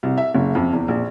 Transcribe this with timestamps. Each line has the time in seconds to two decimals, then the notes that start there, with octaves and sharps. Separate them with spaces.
0.03 C2
0.17 E5
0.34 F#1
0.55 F2
0.73 E2
0.88 A#1